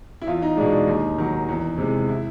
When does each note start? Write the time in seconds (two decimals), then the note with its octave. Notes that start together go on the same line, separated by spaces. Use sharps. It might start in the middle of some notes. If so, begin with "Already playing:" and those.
0.22 E4
0.27 E2 F4
0.42 D#4
0.57 B2 G#3 D4
0.72 D4
0.87 D#2 D#4
1.18 D#3 F#3
1.49 E2
1.78 C3 E3 G#3
2.09 E4